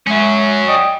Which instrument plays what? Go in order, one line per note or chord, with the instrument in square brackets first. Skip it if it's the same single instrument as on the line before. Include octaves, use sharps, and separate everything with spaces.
[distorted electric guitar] F#3 C#4 [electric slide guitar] G#3 E5
[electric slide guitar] D5 G5 [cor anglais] D#5